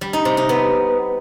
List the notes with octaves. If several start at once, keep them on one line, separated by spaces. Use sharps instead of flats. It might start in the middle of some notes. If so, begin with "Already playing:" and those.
G3
D#4
C3
D#4
B3